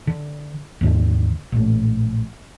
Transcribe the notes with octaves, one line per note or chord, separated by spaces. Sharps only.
D3
D#2 G#2 D3
A#1 A2